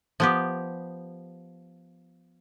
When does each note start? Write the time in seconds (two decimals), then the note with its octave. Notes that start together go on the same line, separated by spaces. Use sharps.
0.20 F3 B3 G4